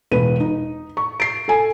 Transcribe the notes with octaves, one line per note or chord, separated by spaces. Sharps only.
E1 E2 B4 D#7
D#4
C#6
C7 D7
A4 G#5